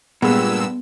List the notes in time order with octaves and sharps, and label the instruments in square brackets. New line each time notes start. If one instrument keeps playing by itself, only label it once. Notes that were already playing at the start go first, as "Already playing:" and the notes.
[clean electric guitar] G2 [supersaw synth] A#2 E6 [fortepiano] G#3 [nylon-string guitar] B3